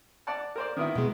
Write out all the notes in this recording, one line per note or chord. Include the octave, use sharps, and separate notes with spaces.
D5 F#5 A5
A#4 C5 D5
D#3 B3 E4
B2 G#3